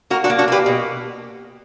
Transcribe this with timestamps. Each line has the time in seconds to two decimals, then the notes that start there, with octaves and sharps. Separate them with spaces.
0.10 A#3 F#4 A#4
0.24 D4 F#4
0.30 A#3
0.38 D4 F#4
0.48 A#3 G4 B4
0.66 B2